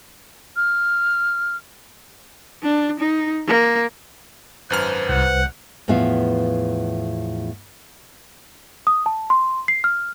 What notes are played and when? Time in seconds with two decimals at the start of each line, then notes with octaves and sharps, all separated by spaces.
0.56 F6
2.63 D4
3.00 D#4
3.47 A#3
4.70 G#1 F#2 B4 C5 F6
5.09 C2 F#5
5.88 E2 A2 F3 B3 E5 F5
8.87 D#6
9.06 A5
9.30 C6
9.68 C7
9.84 F6